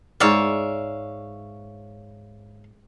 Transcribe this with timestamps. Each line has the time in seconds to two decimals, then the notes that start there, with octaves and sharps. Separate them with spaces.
0.20 G#2 C#5 D5 E5 F5